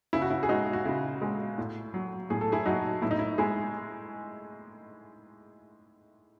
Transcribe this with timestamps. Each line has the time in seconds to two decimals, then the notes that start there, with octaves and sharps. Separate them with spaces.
0.13 C#3 E4
0.22 F#4
0.30 E4
0.43 G#4
0.49 G#3 D#4 F#4
0.73 F#4
0.85 C#3 E4
1.22 G#3
1.58 A2
1.94 F#3
2.30 A2 G#4
2.41 A4
2.52 E4 G#4
2.66 F#3 D#4 F#4
3.02 A2 E4
3.11 D#4
3.19 E4
3.38 G#3 E4 G#4